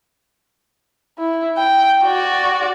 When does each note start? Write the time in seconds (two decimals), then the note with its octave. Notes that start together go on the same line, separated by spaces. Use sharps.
1.18 E4
1.58 G5
2.05 F#4 D5